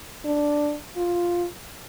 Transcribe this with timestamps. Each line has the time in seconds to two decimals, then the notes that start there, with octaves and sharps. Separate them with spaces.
0.25 D4
0.96 F4